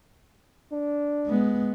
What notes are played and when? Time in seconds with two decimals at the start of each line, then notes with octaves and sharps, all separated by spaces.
0.72 D4
1.26 G#3 B3